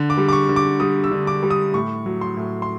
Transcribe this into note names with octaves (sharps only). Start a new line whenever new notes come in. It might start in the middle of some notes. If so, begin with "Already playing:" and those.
Already playing: D3
D6
G3
D6
C#6
D3
D6
G3 D#6
E6
D3
D6
G3
D#6
A2 C#6
F#3
C6
A2
C6